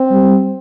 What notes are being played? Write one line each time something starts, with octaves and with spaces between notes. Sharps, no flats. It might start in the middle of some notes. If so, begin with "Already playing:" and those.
Already playing: C4
G3